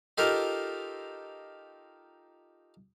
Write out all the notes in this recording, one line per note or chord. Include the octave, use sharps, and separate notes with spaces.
D#4 F4 G4 A4 A#4